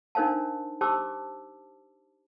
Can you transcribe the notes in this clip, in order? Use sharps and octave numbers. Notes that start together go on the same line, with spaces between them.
D4 D#4 A#4 C5 F5 A5
G4 C5 A5 D6 E6